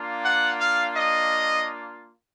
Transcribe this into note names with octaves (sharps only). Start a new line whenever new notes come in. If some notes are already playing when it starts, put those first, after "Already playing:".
Already playing: A#3 D4 F4
F#5
F5
D#5